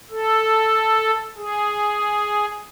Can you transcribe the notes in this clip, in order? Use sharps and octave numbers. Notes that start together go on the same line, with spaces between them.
A4
G#4